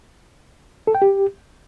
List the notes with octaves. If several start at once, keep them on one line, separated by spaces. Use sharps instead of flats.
A4
G5
G4